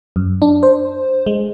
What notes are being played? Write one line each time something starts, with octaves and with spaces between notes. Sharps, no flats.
F#2
D4
C5
G#3